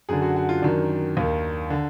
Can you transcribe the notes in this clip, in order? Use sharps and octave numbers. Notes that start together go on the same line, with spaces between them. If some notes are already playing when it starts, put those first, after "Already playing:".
F#2 D3 G#4
F#4
F#4
F4
F#2 D#3 D4
D#2 D#3
D3